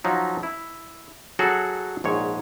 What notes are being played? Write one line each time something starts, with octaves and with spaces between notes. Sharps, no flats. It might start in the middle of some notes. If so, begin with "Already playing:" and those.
F3 F#3 D#4
E4
F#3 F#4 G#4 A4
A#1 G#2 C#5